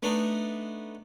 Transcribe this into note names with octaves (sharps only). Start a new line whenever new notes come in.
A3 B3 D4 D#4